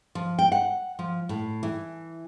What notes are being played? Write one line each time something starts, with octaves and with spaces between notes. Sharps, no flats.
F3
G5
F#5
F3
A2
E3